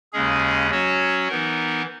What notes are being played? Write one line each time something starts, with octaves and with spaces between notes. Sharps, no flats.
D#2 C#3 G#3 C#4 G#4
F#3 C#4 F#4 C#5
E3 B3 D#4 A#4